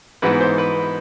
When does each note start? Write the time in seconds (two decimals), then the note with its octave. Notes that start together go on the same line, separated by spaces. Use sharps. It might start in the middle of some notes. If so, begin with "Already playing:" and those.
0.22 G#2 E3 B3 B4
0.40 C5
0.58 B4